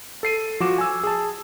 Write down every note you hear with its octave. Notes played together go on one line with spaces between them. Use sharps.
A4 C7 D#7
F3 F#4 D6 E7
G#5 E6
G#4 A5